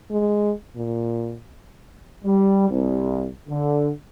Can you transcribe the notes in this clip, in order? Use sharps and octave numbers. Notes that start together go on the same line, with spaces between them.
G#3
A#2
G3
C2
D3